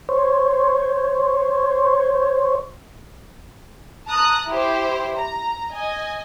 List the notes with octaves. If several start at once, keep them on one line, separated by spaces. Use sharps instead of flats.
C5 C#5
A5 A#5 D#6 F#6
E4 G4 C5
A#5
D#5 G#5